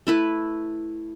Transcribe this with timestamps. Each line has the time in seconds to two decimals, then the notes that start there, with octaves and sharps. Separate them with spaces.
0.07 A3 E4 B4